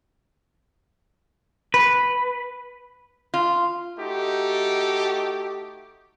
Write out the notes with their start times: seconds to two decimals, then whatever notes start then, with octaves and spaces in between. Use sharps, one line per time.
1.74 B4
3.34 F4
3.99 A3 D#4 F#4 G4